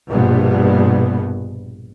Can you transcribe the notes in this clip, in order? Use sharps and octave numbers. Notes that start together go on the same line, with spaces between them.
A#1 G2 B2 B3